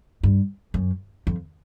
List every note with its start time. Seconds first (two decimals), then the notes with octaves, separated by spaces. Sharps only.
0.23 G2
0.74 F#2
1.27 F2